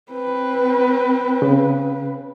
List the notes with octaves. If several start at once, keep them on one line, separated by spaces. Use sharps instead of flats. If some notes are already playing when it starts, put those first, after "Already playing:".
C4 B4
C#3